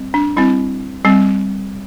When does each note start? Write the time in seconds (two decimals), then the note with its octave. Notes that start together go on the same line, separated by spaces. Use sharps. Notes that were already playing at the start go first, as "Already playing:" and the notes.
Already playing: G3 C4
0.14 D4
0.36 G3 C4 E4
1.05 G3 C4